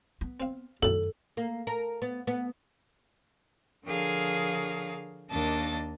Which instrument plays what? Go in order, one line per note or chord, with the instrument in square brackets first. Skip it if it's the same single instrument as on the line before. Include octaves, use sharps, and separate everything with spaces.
[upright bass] B3
[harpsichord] C4 F5
[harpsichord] B1 A2 [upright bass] F#2 D#3 [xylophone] A4
[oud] A#3
A#4
B3
B3
[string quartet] D3 F3 G#4 A#4 C#5 F5
D#2 A#3 D4 D#5 A5 A6